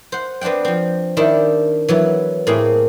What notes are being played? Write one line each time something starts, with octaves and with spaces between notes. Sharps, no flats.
C5 F#5
B3 C4 D4 F#5 G5
F3 C4
D#3 D4 E4 G4
E3 F#3 B3
A2 A#3 C4 G#4